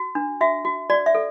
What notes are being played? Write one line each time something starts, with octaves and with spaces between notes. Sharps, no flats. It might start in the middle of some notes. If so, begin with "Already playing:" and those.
Already playing: F#4
D4
F#4 E5
F#4
F#4 D5
E5
A4